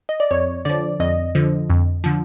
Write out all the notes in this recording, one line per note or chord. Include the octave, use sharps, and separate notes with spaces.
D#5
D5
F2 C#5
D3 F3 D5
F2 D#5
D3 F3
F2
D3 F3